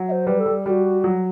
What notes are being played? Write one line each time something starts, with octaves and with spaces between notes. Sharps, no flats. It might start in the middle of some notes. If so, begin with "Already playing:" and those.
Already playing: F#3
E5
C5
G3 B4
A4
G3
G3 F#4 G4
F#3